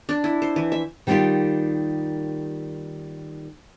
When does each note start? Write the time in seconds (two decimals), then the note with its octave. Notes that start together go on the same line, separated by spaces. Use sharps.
0.09 D4
0.24 E4
0.42 C5
0.56 E3
0.72 E5
1.07 D#3 G3 A#3 B3 F4 G4